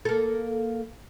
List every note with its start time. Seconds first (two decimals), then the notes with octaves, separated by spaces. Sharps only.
0.05 A#3 A4